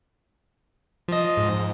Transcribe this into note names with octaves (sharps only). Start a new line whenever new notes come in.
F3 D#5
G#2